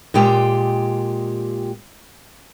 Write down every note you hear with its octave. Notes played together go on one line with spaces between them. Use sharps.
A#2 G#3 G4 G5